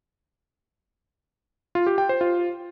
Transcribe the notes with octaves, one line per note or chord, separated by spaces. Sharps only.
F4
G4
G5
C5
F4